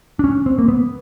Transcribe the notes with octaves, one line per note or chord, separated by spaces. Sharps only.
D4
C#4
C4
A#3
B3